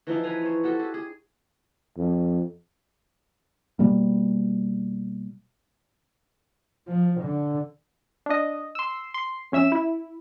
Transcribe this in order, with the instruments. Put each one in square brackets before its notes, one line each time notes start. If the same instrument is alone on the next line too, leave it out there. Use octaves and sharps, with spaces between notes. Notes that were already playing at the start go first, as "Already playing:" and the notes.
[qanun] E3 F3 D#4 E4
B4 C5 G#5 A#5
C5 C#5
F#4 G4 A4 G5
G4 G#4
G#4
[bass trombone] F2
[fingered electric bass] B2 G3 A#3
[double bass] F3
D3
[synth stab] D4 D#5
C6 E6
C6
F2 C#4 E5 E6 E7
E4